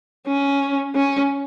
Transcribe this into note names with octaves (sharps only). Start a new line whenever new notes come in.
C#4
C#4